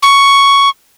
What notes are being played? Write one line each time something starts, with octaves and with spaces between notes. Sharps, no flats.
C#6